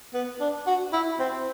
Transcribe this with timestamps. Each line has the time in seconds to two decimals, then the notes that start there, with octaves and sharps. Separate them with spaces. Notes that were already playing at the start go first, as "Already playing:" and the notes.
0.14 B3
0.40 D4
0.67 F#4
0.93 E4
1.20 C4